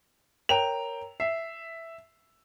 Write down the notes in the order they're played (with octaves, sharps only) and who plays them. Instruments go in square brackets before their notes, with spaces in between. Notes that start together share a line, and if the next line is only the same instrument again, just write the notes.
[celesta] A#4 C#5 A#5 [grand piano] G5 F7
[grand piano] E5 [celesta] C7